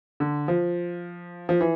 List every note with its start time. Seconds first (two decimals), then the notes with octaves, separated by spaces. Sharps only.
0.20 D3
0.48 F3
1.49 F3
1.61 E3